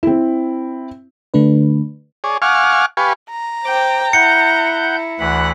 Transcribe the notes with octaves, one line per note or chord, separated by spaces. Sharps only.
C4 E4
D3 A3 D4 B4
G#4 C#5 D5
F5 F#5 G#5 C#6 D6 F6
G4 B4 F5 G#5 C#6
A#5
C5 G5 D6
E4 F#5 G6 C#7
D2 E3 F#5 B5